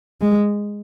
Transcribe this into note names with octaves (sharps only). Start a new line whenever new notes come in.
G#3